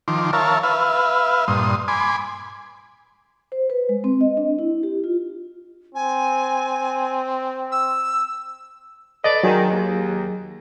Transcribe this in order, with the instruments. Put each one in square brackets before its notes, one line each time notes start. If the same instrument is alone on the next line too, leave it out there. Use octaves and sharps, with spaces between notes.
[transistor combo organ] D#3 F3 C6 D6
A#4 C#5 E5 F5 A5
B4 E5 F5
G2 A#2 C6 D#6
G#5 B5 C6 D6
[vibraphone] C5
B4
G#3
C4
D#5
D4
E4
G4
F4
[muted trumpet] C4 [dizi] G#5
[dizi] E6
[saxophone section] A4 B4 D5 [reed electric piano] D#5
[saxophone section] D#3 [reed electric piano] F#3 G#4
[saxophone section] D#2